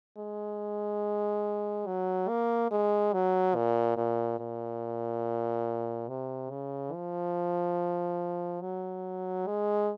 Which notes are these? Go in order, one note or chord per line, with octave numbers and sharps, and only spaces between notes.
G#3
F#3
A#3
G#3
F#3
A#2
A#2
A#2
C3
C#3
F3
F#3
G#3